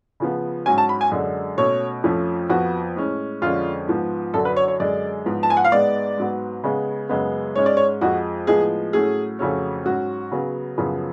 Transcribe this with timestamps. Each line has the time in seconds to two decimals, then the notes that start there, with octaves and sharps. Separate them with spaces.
0.20 C#3 F3 B3
0.66 G#2 F#3 C#4 G#5
0.78 A5
0.89 B5
1.01 G#5
1.12 F#2 D3 G#3
1.58 B2 A3 C#4 C#5
2.04 F2 F3 A3 C#4
2.50 F2 F3 B3 F#4
2.96 A2 G#3 C#4
3.42 F2 D3 G#3 C#4 F4
3.88 G#2 F3 B3
4.34 F#2 D3 F#3 A4
4.45 B4
4.57 C#5
4.68 C#5
4.80 F#2 D3 G#3 D5
5.26 G#2 F3 B3
5.43 A5
5.50 G#5
5.57 F#5
5.65 F5
5.72 G#2 G#3 B3 D5
6.18 G#2 F#3 B3
6.64 C#3 G#3 B3
7.09 F#2 C#3 G#3 B3
7.55 G#2 G#3 C#4 C#5
7.66 D5
7.77 C#5
8.01 F2 F3 G#3 F#4
8.47 A2 F3 G#3 B3 G#4
8.93 A2 F#3 A3 C#4 G#4
9.39 F2 C#3 F#3 A3 C#4
9.85 G#2 F#3 C#4 F#4
10.32 C#3 F#3 B3
10.78 F#2 C#3 F3 B3